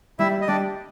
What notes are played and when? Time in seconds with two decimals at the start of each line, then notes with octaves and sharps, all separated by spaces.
0.19 G3 E4 E5
0.41 D#5
0.48 G3 D4 D5